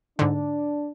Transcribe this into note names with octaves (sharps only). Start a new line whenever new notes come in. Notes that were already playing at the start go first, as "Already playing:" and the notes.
G#2 D3 D4